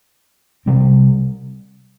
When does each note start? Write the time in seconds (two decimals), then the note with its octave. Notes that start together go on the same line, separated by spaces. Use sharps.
0.66 C3 G3 C4